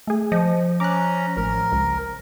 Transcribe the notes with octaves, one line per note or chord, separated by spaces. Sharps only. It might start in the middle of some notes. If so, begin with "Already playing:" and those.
A3 G#4
F3 D#5
C#4 A#5 D6 F#6
A1 A#4
C#2